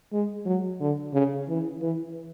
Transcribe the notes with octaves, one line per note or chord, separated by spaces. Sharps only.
G#3
F#3
D3
C#3
E3
E3